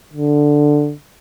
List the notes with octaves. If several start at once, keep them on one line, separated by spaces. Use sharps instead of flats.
D3